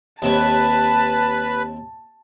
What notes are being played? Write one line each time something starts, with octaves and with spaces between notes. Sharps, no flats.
D#2 C3 B4 C#5 A5